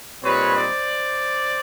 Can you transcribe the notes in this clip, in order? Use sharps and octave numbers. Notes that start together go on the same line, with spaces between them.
A#2 G3 C4 D#4 B4 C#5
C5 D5